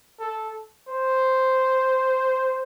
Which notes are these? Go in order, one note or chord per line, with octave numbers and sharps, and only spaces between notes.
A4
C5